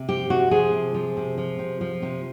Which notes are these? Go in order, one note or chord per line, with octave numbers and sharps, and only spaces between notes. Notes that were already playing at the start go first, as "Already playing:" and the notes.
Already playing: C3
F3 G4
C3 F#4
F3 G#4
C3
F3
C3
F3
C3
F3
C3